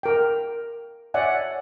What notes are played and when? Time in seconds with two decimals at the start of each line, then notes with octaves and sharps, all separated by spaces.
0.03 A#4 G5
1.14 C#5 D5 E5 F#5 G#5